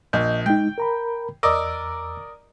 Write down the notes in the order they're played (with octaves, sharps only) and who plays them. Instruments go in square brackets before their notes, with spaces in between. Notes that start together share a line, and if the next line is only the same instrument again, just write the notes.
[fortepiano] A#1 [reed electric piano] D#5 G6
[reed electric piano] G#3 D#4 [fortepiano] G5
[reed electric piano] A#4 A#5 B5
[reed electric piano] E2 E6 [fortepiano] A#4 D5 D#5